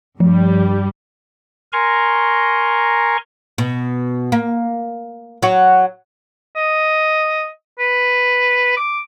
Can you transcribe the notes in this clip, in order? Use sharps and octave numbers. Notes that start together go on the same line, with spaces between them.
G2 F3 G3
A#4 G#5 A#5 C6 C#6
B2
A#3
F#3 F#4
D#5
B4
D6